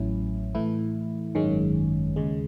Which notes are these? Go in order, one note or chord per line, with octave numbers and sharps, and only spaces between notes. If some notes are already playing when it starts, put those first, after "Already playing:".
Already playing: A1 A2 F#3 C#4 E4
A2 E3 A3 E4
G#1 F#2 D#3 G#3 C#4
D#2 C#3 G#3